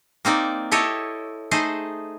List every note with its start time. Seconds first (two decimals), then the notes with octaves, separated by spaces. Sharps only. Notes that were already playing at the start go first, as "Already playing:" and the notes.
0.25 A#3 C4 D#4 D5
0.71 E4 G4 A4 C#5 D#5
1.51 A3 D#4 G#4 C5 D#5